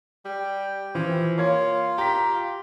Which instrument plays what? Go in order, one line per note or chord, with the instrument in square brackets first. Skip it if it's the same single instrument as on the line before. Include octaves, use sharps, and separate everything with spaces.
[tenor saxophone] G3 [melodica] G5
[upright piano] E3 [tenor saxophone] F3
[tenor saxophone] A#3 [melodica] F4 [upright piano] C#5 G#6
[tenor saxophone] G4 [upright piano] A#5 B6